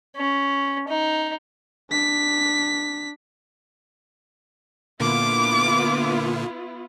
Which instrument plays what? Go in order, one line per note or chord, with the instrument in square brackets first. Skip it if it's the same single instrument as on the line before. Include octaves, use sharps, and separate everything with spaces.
[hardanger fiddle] C#4
D#4
[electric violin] D4 B6
[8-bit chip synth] A#2 D3 A#3 [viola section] B3 E4 F4 [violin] D6